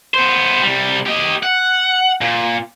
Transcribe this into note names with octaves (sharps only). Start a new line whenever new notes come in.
B3 C5
C3 G3
G4 D#5
F#5
A#2